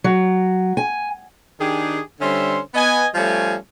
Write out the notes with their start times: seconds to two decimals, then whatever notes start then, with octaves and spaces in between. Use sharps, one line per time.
0.04 F#3
0.77 G#5
1.60 D#3 D4 G4 G#4
2.21 D3 G3 C#4 C5 E5 C6
2.75 B3 D#5 G#5
3.15 F3 G3 A3 C#4 F4 G#5